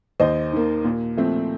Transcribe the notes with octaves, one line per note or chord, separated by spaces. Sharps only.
D#2 C5 D#5
D#3 A#3
A#2
F3 A3 C4